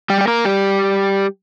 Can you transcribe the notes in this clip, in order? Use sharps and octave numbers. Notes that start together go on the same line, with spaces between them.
G3 G4
G4
A#3 A#4
G3 G4